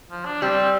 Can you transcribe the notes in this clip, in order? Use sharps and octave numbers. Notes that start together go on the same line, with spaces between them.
F3
D4
G3 C4